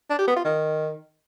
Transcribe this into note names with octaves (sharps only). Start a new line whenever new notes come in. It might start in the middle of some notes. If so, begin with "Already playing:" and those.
D4
G4
B3
F4
D#3